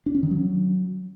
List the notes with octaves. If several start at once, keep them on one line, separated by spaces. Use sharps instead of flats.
D4
C#4
D#3
F#3